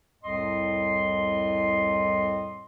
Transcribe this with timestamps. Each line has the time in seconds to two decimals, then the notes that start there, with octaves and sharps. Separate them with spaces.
0.23 C2 F2 A2 D#5 C6